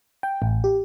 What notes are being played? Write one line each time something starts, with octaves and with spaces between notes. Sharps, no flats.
G5
A1
G4